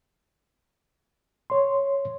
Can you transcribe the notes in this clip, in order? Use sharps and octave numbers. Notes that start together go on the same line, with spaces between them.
C#5 C6